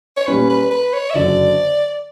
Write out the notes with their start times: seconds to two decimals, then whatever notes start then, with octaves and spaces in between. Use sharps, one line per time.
0.17 C#5
0.27 A#2 G3 C#4 B4
0.50 B4
0.71 B4
0.93 C#5
1.10 E5
1.14 F#1 F#2 D3 F#3 D5